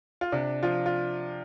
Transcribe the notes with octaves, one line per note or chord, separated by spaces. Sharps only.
F4
C3 D4
F3 F4
F4